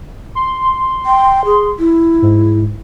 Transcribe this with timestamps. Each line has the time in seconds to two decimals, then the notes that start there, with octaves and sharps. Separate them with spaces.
0.35 C6
1.06 G5
1.45 G#4
1.79 E4
2.22 G#2